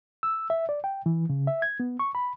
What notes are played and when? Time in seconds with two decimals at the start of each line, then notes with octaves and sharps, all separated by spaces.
0.23 E6
0.50 E5
0.69 D5
0.84 G5
1.06 E3
1.30 C#3
1.47 E5
1.62 G#6
1.80 B3
2.00 C#6
2.15 B5